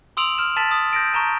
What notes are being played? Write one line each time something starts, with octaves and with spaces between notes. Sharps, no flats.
C6 D#6 E6 D7 F7 F#7
F6 E7
A5 A6 B6 E7 F#7
D#6
G6 A#6 D7
A5 A#5 C#6 G6